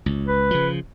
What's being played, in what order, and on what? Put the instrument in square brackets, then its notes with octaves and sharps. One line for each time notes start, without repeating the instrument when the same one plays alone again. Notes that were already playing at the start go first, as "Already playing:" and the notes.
[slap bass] C#2
[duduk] B4
[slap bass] C#3 F3